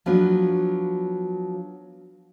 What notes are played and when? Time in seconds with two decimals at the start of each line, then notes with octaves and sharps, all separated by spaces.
0.06 F3 F#3 B3 D4